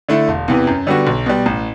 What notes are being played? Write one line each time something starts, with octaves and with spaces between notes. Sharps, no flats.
D3 A3 E4
E1
E2 C3 E3
F#2
D3 G3 B3 F#4
B1
B2 G3
A1